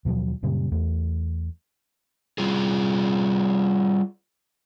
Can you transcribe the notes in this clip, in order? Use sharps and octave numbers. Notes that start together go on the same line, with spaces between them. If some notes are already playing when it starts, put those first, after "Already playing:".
D#2 B2 F3 F#3
F#2 A#2 C#3 G3
E2 A3
G3 F4 G#4